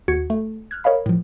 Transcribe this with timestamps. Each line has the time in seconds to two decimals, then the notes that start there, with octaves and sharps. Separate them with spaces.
0.08 D#2 F#4 G#6 C#7
0.30 A3
0.71 F6 F#6 G#6
0.84 A#4 C#5 D#5 F5 B5
1.06 A2 F3